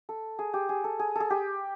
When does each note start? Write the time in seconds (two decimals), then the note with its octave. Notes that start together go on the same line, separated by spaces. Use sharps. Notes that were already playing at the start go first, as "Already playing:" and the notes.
0.09 A4
0.39 G#4
0.54 G4
0.69 G#4
0.84 A4
0.99 G#4
1.15 G#4 A4
1.30 G4